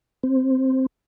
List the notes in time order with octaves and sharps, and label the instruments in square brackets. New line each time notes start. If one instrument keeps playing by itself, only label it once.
[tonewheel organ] C4